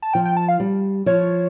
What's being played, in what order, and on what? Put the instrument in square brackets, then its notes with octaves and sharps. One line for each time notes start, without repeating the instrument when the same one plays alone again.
[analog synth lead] A5
[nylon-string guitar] F3 [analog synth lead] G5
[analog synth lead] G5
A5
F5
[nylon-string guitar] G3
[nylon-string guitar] F3 [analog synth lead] C#5